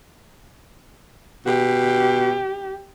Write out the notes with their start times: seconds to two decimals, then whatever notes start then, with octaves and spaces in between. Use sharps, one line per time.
1.46 B2 G4